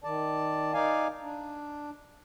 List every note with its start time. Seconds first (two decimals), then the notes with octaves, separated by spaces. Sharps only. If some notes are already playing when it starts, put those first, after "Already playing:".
0.04 D#3 D5 A5
0.73 D#4 D5 F5 G#5
1.23 D4